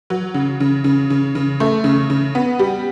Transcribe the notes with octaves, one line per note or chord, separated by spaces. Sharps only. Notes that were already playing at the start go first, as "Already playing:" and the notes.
F#3
C#3
C#3
C#3
C#3
C#3
A3
C#3
C#3
B3
G3